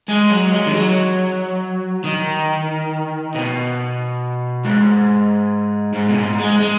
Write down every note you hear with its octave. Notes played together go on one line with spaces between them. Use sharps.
G#3
F#3
G#3
D#3
F#3
D#3
B2
G#2
G#2
B2
G#2
G#3
G#3